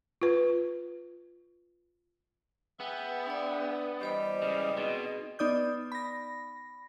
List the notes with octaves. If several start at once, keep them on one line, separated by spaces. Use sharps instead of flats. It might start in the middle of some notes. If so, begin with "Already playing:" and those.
F4 B4
B3 G#4 E5 G5
D4 D5
E3 G3 G4 C5 D#5 B5
C#3 G#3
B2 C4 D#4 G#4
B3 D#4 D5 D#6 G6
B5 A#6